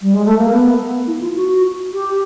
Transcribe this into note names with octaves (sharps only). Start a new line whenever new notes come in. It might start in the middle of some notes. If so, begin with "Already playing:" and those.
G3
G#3
A3
A#3
B3
E4
F4
F#4
G4